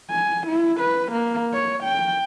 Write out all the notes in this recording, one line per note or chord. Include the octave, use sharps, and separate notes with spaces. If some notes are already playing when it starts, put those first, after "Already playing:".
G#5
E4
B4
A#3
C#5
G5